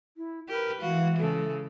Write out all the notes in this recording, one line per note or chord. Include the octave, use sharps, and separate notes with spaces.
E4
G4 A#4 B4
E3 G#3 F#4 F5
C#3 A4